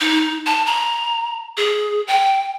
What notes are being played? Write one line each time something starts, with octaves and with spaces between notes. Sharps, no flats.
D#4
A5
A#5
G#4
G5